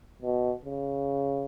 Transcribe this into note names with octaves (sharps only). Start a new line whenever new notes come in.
B2
C#3